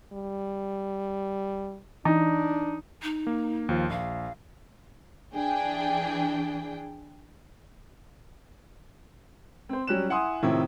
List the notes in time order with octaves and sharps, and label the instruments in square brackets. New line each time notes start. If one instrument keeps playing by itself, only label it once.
[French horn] G3
[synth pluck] E3 [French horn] D4 [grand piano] D#4
[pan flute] D#4
[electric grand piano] A#3
D#2 F3 F4
[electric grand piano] A#1 [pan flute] F5
[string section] E3 D4 G#4 G5
[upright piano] C4 C5
F#3 G3 C#4 F#6 E7
E4 F#5 G#5 C6 D#6
A2 C3 D#3 F3 C4 E4